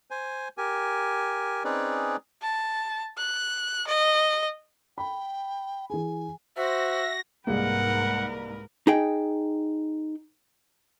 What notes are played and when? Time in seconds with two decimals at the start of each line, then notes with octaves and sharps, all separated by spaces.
0.11 C5 G#5
0.58 G4 A#4 G#5
1.64 C4 C#4 D#4 G#4 B4 D5
2.42 A5
3.17 F#6
3.87 D#5
4.98 G5 B5
5.90 E3 G#4 G#5
6.57 F#4 C5 E5 A#6
7.47 C2 G#2 G#3 A#3 A#4 B4 F#5
8.87 D#4 G#4 G5